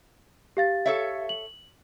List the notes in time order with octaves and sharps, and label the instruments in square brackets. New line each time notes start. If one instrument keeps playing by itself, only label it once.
[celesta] G4 F5 A6
[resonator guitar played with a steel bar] A4 C#5 E5
[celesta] F#7